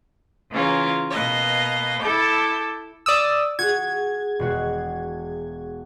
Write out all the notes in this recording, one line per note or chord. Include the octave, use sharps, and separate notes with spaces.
C#3 E3 A#3 C#4 F4 A#4
B2 A#3 B4 D#5
E4 A4 A5 D6 G6
D5 D#6 E6
F#4 G#4 G#6
E1 G#3 F#4